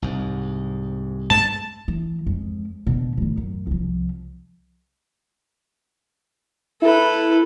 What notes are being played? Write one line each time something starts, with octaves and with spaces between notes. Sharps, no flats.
C2 G#2
G2 G#3 A3 A5
E3
F2 G#3
B2 D3
A2 D#3
F#2
C2 F3
E4 A4 B4